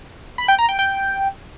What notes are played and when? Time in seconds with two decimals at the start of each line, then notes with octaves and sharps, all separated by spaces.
0.38 B5
0.48 G5
0.59 A#5
0.69 G5
0.79 G5